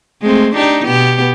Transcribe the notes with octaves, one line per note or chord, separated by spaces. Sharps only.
G#3 A3 C4
D4 D#4 G4
B2 B3 G4